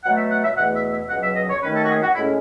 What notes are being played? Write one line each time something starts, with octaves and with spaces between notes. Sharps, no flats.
B2 F#3 A3 F#5
E5
F#5
E5
E2 B2 A3 F#5
E5
E5
C#2 B2 F#3 F#5
E5
D#5
C#5
D#2 D#3 A3 C#4 B4
A4
F#4
G#4
F#4
A2 G#3 C#4 E4